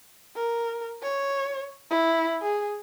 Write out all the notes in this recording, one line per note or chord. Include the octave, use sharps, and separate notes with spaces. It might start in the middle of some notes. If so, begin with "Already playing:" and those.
A#4
C#5
E4
G#4